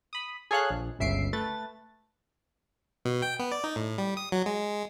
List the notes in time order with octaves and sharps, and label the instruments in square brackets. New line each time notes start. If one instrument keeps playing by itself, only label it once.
[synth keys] B5 D#6
G#4 A4 C#5 F5 F#6
A#1
G1 C#2 E5 C7 D7
A3 B4 A6
[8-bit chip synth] B2
G5
B3
D5
D#4
A2
G3
D#6
F#3
G#3